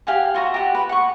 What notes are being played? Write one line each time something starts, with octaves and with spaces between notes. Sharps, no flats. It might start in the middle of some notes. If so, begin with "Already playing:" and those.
G4 F5 F#5 G#5
F4 F#4 E5 A#5
G4 F#5
B4
F#5 C#6